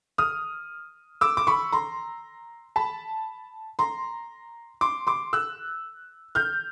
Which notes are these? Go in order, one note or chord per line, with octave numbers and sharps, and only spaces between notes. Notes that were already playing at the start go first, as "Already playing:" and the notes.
D#6 F6
D6 E6
D6
B5 C#6
A#5 C6
A5 B5
A#5 C6
C6 D6
C6 D6
E6 F#6
F6 G6